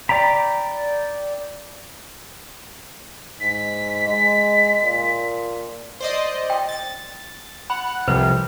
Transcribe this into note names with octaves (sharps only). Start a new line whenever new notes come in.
D5 G5 A#5 B5
G#2 B6
G#3
A#2
C5 D5 D#5
G5
A6
F#5 B5
C2 F2 C3 B4